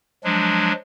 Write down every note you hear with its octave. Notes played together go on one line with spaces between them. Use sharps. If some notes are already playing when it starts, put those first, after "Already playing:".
F3 F#3 G#3 D4